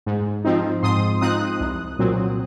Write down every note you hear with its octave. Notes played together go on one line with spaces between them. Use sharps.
G#2
F3 C4 D#4
G#2 C6 D#6
F3 C4 D#4 D#6 F#6
C2
A#2 F#3 C4